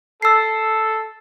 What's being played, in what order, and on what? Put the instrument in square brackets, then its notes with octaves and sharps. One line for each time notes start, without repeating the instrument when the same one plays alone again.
[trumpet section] A4 [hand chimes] E6 C7